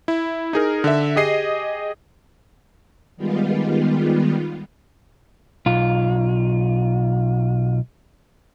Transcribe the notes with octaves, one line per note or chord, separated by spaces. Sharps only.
E4
D#4 G#4 A#4
D3 E5
G4 G#4 D#5 C7
D#3 G3 G#3 B3 F4
B1 F4